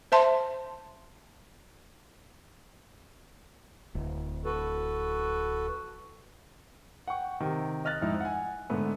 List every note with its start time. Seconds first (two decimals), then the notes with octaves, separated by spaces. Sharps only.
0.12 C5 E5 A5 C6
3.95 D1
4.45 F#4 A4 B4
7.08 F#5 G5 C#6
7.40 C3 D#3
7.85 D#5 F6 F#6 A6
8.01 F2 G#2 D#4 E4
8.20 F#5 G#5
8.70 G#2 D3 A3 B3